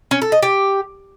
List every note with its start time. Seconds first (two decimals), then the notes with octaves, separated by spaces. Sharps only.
0.11 C#4
0.22 A4
0.32 D#5
0.42 G4